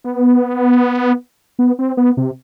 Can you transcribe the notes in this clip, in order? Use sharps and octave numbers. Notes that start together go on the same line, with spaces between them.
B3
B3
C4
B3
C3